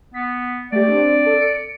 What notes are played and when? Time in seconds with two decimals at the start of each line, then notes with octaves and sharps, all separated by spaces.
0.14 B3 B6
0.72 A3 G4 D5
0.88 C4 D4
1.26 A4
1.39 C#7 D7